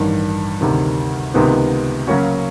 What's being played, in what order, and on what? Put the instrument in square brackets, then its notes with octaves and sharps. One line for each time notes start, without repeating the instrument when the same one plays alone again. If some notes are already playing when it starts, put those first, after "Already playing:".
Already playing: [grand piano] A1 G2 D#3
D2 C3 D#3
C#2 C3 D#3 G#3 B3
C#3 F#3 A#3 C#4 F#4